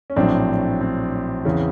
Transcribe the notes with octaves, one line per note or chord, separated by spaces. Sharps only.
C#4
A#1 A2 F#3 C4 D4
C4
E2 C#3 E3